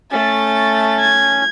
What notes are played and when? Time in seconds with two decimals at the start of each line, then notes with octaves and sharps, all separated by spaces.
0.11 A3 C#4 A6
1.01 G#6